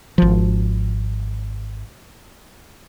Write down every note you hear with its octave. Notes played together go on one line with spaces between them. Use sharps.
G#1 F3